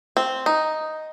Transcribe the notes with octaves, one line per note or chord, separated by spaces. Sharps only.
C4
D#4